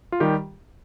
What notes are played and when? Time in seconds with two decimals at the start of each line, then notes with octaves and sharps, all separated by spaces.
0.12 F4
0.20 D#3 G3 G4